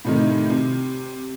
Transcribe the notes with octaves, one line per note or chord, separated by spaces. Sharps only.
A2 C3 D#3
C3